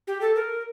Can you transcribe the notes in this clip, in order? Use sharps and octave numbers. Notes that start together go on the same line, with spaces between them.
G4
A4
A#4